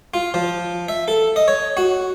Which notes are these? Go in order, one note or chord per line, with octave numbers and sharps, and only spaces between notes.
F4
F3
E5
A4
D#5
C#5
F#4